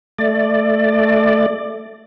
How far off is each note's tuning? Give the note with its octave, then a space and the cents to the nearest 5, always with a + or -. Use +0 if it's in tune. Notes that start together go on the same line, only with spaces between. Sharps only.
A3 +0 D5 +15